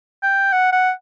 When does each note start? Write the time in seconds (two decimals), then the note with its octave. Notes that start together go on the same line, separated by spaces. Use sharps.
0.23 G5
0.53 F#5
0.73 F#5